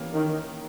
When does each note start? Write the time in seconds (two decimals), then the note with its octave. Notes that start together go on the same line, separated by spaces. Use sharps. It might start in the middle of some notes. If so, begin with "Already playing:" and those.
Already playing: E3 A#3 C#4 G4 A#4
0.13 D#3